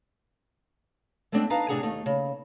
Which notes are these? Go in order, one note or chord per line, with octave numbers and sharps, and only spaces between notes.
G#3 A3 B3 C4 D4
D#4 B4 F5 A5 A#5
A2 C3 D4 G#4 F#5 A#5
D#2 A3 D#4
C#3